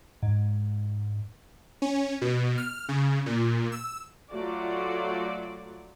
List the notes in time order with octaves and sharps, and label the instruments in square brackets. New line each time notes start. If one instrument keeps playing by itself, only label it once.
[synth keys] G#2
[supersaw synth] C#4
B2
F6
C#3
A#2
E6
[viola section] F#3 A3 F4 F#4 D5